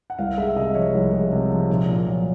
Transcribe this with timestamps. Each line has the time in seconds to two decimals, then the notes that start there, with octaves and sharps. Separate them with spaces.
0.10 F#5
0.19 C2 F5
0.38 G#3 E5
0.56 C3 D#5
0.75 F3 C#5
0.94 C2
1.13 G#3
1.32 C3
1.50 F3
1.70 A#2
1.88 A#2
2.07 F#3